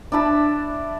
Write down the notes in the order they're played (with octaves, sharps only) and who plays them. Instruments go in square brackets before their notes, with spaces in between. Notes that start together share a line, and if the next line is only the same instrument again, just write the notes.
[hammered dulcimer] D4 E4 A5 B5